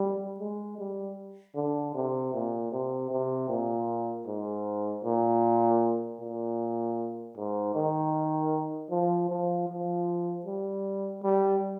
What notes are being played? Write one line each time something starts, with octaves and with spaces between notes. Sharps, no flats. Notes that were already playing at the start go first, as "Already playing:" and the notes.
Already playing: G3
G#3
G3
D3
C3
A#2
C3
C3
A#2
G#2
A#2
A#2
G#2
D#3
F3
F3
F3
G3
G3